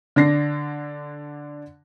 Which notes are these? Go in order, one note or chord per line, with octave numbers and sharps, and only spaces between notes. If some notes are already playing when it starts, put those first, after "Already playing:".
D3 D4 A#6 C7